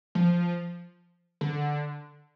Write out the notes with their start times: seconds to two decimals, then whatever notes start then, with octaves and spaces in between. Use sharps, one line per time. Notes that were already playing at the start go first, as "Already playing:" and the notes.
0.15 F3
1.41 D3